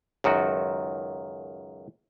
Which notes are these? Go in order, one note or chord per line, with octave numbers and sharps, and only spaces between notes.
C#2 F#2 D#3 F#4